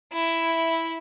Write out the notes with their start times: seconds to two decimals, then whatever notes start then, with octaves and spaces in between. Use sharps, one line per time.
0.13 E4